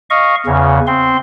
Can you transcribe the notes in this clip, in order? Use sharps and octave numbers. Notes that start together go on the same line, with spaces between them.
D#5 F5 C#6
E2 C#3
C4 C6